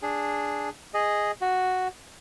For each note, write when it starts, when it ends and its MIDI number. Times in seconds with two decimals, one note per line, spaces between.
0.02 0.69 62
0.02 0.69 68
0.94 1.32 68
0.94 1.32 75
1.41 1.88 66